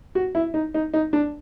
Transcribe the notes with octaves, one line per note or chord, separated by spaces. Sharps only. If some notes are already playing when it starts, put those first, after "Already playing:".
F#4
E4
D#4
D#4
D#4
D4